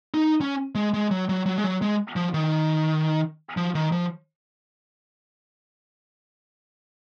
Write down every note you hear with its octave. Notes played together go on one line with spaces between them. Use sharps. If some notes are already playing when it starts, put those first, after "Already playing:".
D#4
C#4
G#3
G#3
F#3
F#3
F#3
G#3
F#3
G#3
F3
D#3
F3
D#3
F3